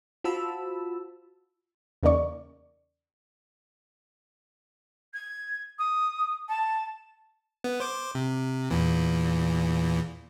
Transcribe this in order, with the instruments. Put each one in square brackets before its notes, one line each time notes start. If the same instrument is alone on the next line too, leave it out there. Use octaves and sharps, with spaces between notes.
[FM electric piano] F4 F#4 C5 A5 B5 E6
[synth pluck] E2 C#3 A#3 D#4 D5 C#6
[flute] G#6
D#6
A5
[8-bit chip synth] B3
C5 D6
C3
E2 A#2 E3